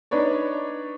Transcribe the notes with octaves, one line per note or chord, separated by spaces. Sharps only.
D4 D#4 B4 C#5 D5